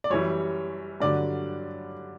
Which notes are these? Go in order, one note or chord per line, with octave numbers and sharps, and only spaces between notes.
D5
F#2 E3 G3 C#5
G2 D3 F#3 D5